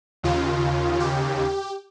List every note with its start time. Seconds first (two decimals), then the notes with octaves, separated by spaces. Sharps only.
0.23 D#2 C#3 F4
1.00 G4